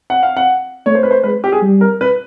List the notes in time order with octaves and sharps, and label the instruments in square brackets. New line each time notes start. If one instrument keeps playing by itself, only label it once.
[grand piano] F#5
F5
F#5
[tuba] A3 [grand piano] C#5
[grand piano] C5
B4
C5
[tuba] G#3 [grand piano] B4
[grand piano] G4
G#4
[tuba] G3
[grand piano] A#4
B4